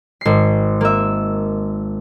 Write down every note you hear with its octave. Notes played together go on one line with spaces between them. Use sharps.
G#1 C7
A#3 E5